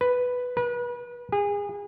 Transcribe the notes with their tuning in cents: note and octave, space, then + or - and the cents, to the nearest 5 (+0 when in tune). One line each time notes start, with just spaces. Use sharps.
B4 +5
B4 -30
G#4 -30